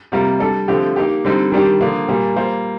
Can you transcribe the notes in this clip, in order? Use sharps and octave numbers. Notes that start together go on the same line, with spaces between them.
C3 G3 A#3 F4 A#4
G3 D4 A4 D5
D3 F3 A3 C4 G4
A#3 D#4 G4
D3 G3 C4 D#4
D#3 G3 D4 G4
D3 F3 A#3
A#2 G3 A#3
G3 A#3 F4 C5